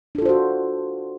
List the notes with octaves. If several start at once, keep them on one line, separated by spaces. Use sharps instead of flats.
D4 F4 F#4 A4 C5